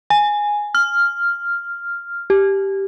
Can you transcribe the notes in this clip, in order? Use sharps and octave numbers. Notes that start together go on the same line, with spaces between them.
G#5
F6
G4